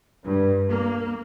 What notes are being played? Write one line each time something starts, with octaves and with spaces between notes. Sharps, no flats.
G2
A#3